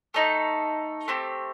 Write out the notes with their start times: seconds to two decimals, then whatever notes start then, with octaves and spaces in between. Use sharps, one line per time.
0.14 A3 D#4 A4
1.08 A3 C4 G4